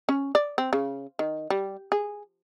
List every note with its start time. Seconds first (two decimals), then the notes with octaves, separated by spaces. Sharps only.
0.09 C#4
0.35 D5
0.58 C4
0.73 C#3
1.19 D#3
1.50 G3
1.92 G#4